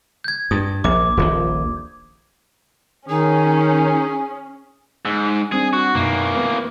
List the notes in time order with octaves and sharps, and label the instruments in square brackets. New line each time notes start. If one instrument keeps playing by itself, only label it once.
[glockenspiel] G6 G#6
[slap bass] G2 [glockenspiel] D#6
[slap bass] A#1 [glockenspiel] D6
[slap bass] D#1 A#1 F3
[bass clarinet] D#3 [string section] C#4 [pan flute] D#4 [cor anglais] G#4
[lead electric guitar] G#2 [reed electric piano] E6
[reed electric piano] G3 C4 D4 [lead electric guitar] G#4
[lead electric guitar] F#4
[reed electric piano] F#2 B2 D#4 [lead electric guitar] E3 A#3
[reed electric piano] A3 B3 B4